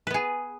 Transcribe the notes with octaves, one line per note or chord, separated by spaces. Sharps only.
B3 G#4 B4